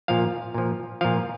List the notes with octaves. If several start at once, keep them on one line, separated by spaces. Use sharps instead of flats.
A#2 F3 F5
A#2 F3
A#2 F3 F5